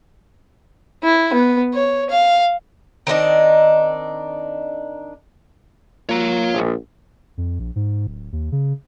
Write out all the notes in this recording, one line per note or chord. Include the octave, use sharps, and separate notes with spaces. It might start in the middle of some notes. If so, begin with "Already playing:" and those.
E4
B3
C#5
F5
D#3 C4 D4 D#4
A#3 F4 C#5 A#5
A#1
F2
A#1
G#2
D1
D#2
C#3